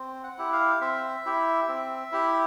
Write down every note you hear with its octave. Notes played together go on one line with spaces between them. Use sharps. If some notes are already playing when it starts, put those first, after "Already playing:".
Already playing: C4
F#5
E4 G4
F5
C4 E5
E4 G4
C4
E4 G4